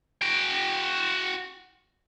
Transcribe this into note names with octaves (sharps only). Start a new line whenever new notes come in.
F#4 G5